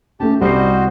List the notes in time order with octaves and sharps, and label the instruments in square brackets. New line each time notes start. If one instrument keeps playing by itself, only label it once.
[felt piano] A3 C#4 [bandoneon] G4 A5
[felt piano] C2 C7 [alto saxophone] G3 [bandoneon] F#4 C5 D#5